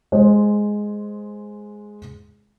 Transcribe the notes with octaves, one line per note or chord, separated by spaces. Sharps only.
G#3 G#4 C5